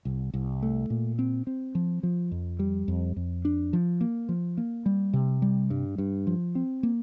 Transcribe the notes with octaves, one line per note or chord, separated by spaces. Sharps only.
C2
C2
A3
A#2
C4
C4
F3
F3
F2
G3
F2
F2
D4
F3
A#3
F3
A#3
G3
C3
G3
G2
G2
F3
C4
A#3